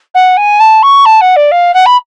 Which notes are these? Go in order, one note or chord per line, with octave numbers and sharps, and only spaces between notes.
F#5
G#5
A5
C#6
A5
F#5
D5
F5
F#5
B5